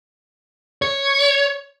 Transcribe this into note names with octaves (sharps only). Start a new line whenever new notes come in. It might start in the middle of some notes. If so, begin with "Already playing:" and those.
C#5